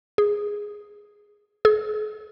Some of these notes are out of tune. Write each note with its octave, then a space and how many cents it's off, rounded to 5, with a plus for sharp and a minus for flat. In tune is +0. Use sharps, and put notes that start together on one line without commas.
G#4 -5
G#4 +45